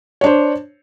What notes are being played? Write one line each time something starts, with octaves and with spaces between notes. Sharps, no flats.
D4 C5 C#5